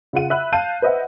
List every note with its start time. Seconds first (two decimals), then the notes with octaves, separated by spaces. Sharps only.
0.13 C#3 F4 F#5 D#7
0.30 E5 B5 F#6 F#7
0.52 F5 A5 G6 D#7
0.82 B4 C5 D#5 E5 F#5